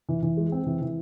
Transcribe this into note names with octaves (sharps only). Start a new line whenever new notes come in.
E3
E3
G#3
C4
E3
E3